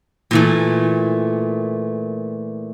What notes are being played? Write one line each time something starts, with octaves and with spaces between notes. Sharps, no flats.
A#2 E3 A3